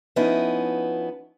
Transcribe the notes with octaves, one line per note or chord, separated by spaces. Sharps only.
F3 B3 C#4 D#4 E4